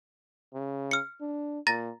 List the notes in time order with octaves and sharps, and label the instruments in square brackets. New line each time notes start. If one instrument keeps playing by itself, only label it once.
[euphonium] C#3
[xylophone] F6 C#7
[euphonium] D4
[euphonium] A#2 [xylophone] A#5 A6 A#6